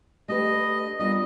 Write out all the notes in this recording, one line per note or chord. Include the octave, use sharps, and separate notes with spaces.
A3 D4 G4 B4 D#5
G3 B3 D4 F4 A#4 D#5